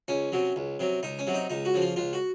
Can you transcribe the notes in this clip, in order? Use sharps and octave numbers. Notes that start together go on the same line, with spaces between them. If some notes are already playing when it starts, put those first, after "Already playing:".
C#2 C#4
C3 F#3
C#2
C3 F#3
C#2 D#4
C#4
C3 F#3
D#4
C#2 D#4
F#4
C#3 F3
F4
C#2 F4
F#4